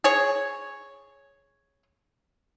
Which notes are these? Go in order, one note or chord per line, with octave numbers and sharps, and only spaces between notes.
G#4 C#5